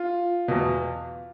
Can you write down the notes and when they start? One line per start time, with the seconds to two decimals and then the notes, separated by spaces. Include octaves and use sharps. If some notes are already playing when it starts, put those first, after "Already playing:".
Already playing: F4
0.48 E2 B2